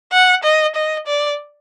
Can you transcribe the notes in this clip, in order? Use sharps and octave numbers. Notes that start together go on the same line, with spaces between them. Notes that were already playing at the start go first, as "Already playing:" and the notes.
F#5
D#5
D#5
D5